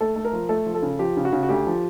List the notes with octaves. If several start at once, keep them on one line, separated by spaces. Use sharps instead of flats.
A3 A4
A3
A#4
F3
A3 A4
F3
A4
C#3
F3 G4
C#3
F#4
C#3
F#4
D2 G4
F3